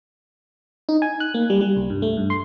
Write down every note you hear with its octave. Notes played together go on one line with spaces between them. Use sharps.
D#4
G#5
F#6
A#3
G3
G3
C2
G2
A3
G2
C6